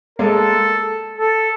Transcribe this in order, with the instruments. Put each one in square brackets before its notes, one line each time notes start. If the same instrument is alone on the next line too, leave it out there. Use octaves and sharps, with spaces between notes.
[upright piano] G#3 A#3 [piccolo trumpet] A4
[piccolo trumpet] A4